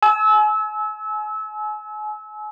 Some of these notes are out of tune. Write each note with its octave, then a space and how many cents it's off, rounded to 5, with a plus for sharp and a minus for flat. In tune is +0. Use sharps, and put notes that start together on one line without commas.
G#5 +35 E6 -25